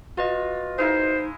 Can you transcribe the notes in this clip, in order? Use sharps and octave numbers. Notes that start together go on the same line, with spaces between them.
F4 F#4 B4 D#5
G#3 D#4 E4 A#4 C5